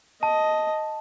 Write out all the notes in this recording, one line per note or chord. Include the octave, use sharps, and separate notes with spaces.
D#5 A5